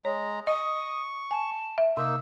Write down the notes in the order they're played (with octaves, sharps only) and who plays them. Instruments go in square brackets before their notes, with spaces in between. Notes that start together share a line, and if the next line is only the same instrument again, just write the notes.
[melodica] G#3 A#5 [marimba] C#5
[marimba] D#5 [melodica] C#6 [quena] D#6
[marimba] G#5 [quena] A5
[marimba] E5
[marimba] C3 [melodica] A#3 D#4 [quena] E6